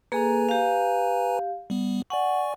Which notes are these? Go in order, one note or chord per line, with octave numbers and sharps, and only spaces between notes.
A#3 G#4 A4 B4 G#5 A#5
G4 F5
G3 B3
D5 F#5 G#5 C#6